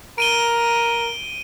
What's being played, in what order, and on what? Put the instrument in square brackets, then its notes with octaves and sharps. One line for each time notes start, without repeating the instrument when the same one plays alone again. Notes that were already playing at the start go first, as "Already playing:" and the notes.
[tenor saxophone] A#4 [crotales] D7 D#7 G7